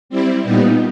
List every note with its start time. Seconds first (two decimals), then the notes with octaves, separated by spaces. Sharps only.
0.09 G3 C4 E4
0.43 A#2 G3 B3 D#4